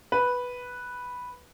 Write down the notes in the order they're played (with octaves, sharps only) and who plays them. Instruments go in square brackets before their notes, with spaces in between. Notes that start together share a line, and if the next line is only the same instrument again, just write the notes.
[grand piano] B4